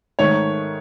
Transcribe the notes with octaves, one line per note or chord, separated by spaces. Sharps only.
G#2 D#3 A3 C#5